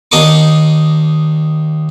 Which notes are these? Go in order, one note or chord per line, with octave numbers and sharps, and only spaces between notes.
D#2 D4 A#4 D#5 C#6 D6